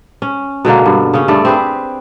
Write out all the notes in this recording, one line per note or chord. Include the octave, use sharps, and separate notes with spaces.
C#4
B2 D3 G#3 A#3
G2
C#3 C#4
G2 A3 D5
C4 G4 G#4 B4